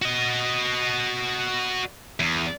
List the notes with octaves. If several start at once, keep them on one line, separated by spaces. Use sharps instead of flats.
F#4 D#5
E2